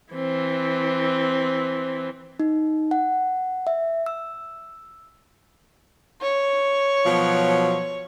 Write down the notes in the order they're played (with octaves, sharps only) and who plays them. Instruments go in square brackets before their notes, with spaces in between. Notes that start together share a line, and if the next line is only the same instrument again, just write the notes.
[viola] E3 C4
[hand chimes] D#4
F#5
E5
E6
[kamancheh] C#5
[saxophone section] B2 F3 F#3